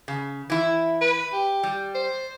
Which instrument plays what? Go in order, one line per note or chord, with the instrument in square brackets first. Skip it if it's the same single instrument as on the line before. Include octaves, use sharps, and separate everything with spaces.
[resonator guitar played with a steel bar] C#3
E3 E4
[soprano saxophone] B4
G4
[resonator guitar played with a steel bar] G3
[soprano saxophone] C5